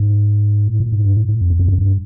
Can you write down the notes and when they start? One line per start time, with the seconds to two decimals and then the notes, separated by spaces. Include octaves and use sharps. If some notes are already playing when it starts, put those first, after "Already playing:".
Already playing: G#2
0.68 A2
0.80 A#2
0.92 G#2
1.05 G2
1.17 A2
1.29 A2
1.41 F2
1.50 E2
1.59 F2
1.68 F#2
1.78 G2